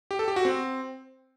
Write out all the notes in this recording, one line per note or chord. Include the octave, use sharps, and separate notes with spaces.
G4
A4
G4
F#4
C4